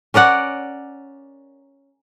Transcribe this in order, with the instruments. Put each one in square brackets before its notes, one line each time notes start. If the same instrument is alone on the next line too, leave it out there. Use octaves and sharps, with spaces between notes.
[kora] C#4 A#4 D5 F#5